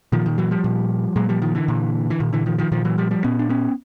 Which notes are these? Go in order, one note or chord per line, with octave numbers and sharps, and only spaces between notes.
A#2 D#3 F3
D#3
E3 F#3
F3 G3
A#2
A#2 F#3 G#3
F3 G3
D#3 F3
D3 E3
A#2
E3
A#2 D#3
D3 E3
D#3 F3
D#3 F3
A#2 D#3 F3
E3 F#3
F3 G3
F3 G3
A#2 B3 C#4
D4
B3 C#4